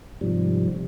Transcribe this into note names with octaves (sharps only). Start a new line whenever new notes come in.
G#2 C3 F3 G3